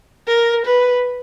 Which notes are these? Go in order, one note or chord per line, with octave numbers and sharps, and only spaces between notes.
A#4
B4